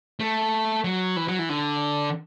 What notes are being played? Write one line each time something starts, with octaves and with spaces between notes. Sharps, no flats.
A3
F#3
E3
F#3
E3
D3